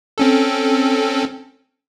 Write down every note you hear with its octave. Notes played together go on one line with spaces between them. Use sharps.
C4 C#4 A4